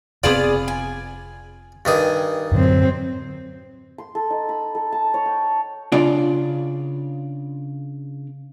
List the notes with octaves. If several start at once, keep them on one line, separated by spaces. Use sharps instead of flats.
F1 B2 B3 C4 F4 G#4 D5
G#5
G2 D#3 G#4
F#2 A2 D3 F#3 C4
C6
A4
D#4
B5
A4
A5
C#5
G5
C#3 D4 F4 D5